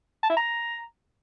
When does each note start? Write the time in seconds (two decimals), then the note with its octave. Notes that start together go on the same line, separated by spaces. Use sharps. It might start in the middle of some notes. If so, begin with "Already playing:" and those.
0.23 A5
0.30 E4
0.36 A#5